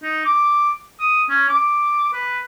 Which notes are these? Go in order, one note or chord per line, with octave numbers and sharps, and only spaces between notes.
D#4
D6
D#6
C#4
D6
B4